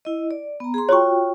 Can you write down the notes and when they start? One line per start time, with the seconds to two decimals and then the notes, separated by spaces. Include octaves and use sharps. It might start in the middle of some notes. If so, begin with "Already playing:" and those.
0.05 E4 D#5
0.31 D5
0.60 B3 A#5
0.74 G#4 A#5 C6
0.89 F4 F#4 C#5 G5 C#6